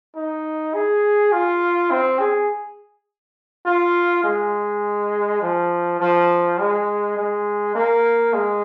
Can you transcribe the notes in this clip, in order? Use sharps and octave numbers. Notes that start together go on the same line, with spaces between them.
D#4
G#4
F4
C4
G#4
F4
G#3
F3
F3
G#3
G#3
A#3
G#3